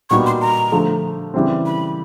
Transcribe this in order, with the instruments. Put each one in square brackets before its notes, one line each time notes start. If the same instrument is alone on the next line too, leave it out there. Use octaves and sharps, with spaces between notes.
[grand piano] A#2 G3 B3 D#4 F#4 [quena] C#6
[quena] C6
A#5
[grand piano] D3 F3 A3
C#3 E3 G3 C4
[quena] B5